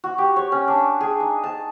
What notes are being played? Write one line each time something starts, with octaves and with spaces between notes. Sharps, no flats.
F#4
G4
C#5
C#4
D4
G#4
D#4
A5